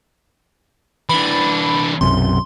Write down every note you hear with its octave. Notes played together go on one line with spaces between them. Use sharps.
E3 D4 B5
B1 F#2 C3 C6